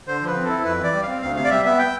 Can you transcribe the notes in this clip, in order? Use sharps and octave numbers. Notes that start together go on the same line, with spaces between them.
D3 C5
F3 B4
C4
E4 A4
F2 B4
E3
D5
G3
F5
C4
D2 F5
C3 F5
D5
G3 E5
B3 E5
G5